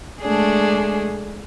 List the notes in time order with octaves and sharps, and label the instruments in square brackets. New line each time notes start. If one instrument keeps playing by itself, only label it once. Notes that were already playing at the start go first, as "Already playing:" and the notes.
[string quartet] G#3 A3 D4 G#4